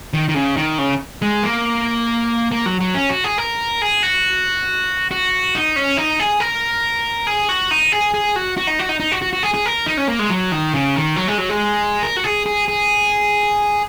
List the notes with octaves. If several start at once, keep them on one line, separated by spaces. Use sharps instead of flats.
D#3
D#3
C#3
D#3
C#3
G#3
A#3
A#3
F#3
F#3
C#4
F#4
G#4
A#4
G#4
F#4
F#4
D#4
C#4
D#4
G#4
A#4
G#4
F#4
D#4
G#4
G#4
F#4
F#4
D#4
F#4
D#4
D#4
F#4
F#4
F#4
G#4
G#4
A#4
D#4
C#4
A#3
G#3
F#3
D#3
C#3
D#3
F#3
G#3
F#3
G#3
A#4
F#4
G#4
G#4
G#4